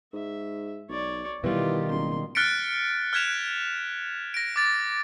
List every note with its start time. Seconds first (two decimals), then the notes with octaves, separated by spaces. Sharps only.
0.14 G#2 E5
0.89 B1 C#5 D5
1.44 B2 D#3 E3 G3 F4 G4
1.90 F#1 C6
2.35 F6 F#6 A6 B6 C#7 D7
3.13 F6 F#6 G#6 B6 E7 F7
4.34 A#6 D7
4.56 D6 A6 D7